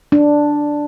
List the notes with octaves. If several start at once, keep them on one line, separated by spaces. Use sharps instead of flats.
D4